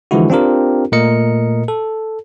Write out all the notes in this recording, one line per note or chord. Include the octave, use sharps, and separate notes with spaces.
D3 E3 F3 G#3 E4 F#4
C4 D4 F4 G4 A#4
A#2 A3 A#4 D#5 C#7
A4